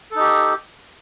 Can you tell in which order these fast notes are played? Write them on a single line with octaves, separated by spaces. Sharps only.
A4 D#4 G4